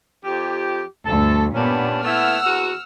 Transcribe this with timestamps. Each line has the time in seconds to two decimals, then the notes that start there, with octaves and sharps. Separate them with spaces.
0.24 F2 G4
1.06 D2 G2 A4
1.54 G2 A#2 B3 C#4 D4
2.03 A3 B3 E4 F#5 E6 F6
2.44 E2 F#4